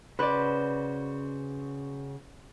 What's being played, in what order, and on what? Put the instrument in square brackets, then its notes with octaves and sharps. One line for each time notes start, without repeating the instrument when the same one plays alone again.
[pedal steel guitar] C#3 F#4 C5 [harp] B4 D5